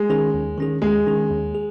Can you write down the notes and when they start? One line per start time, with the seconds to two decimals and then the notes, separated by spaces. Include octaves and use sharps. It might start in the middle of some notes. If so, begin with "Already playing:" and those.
Already playing: G#3
0.10 D#3 C#4 G#4
0.34 D#2
0.58 D#3 C#4 G#4
0.82 D#2 G#3
1.07 D#3 C#4 G#4
1.31 D#2
1.55 G#4